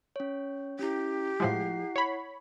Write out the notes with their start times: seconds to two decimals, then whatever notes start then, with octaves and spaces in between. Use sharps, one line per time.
0.16 C#4 C#5
0.79 C#4 E4 G4
1.40 A2 F3 G#3 E4 F#5 C7
1.96 C#5 B5